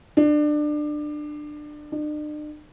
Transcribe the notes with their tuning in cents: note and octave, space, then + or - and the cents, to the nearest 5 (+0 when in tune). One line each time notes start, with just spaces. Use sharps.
D4 +25
D4 +45